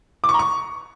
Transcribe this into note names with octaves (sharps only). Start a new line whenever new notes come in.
D6
C#6
A#5
C#6